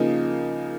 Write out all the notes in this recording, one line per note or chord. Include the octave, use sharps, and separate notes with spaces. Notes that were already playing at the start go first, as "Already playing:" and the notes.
Already playing: C#3 F3 A#3 D#4